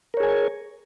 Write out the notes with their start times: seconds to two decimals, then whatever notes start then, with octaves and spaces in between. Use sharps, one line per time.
0.14 A#4
0.17 C#5
0.20 G#4
0.23 G#5